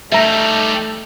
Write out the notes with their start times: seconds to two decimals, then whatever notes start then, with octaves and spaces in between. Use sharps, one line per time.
0.12 G3 A3 D#4 E5 A#5